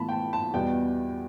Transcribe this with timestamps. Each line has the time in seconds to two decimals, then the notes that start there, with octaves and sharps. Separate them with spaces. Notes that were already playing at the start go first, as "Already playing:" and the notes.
Already playing: A2 E3 B3 A5 B5
0.09 G5
0.12 A5
0.33 A5
0.54 E2 B2 G3 B3 G5